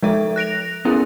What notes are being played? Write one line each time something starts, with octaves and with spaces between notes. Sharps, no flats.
F3 G#3 A4 E5
F#6 A#6 D7 F7
B3 C#4 E4 G#4 A#4